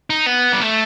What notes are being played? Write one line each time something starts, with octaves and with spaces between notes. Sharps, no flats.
D#4
B3
G3
A3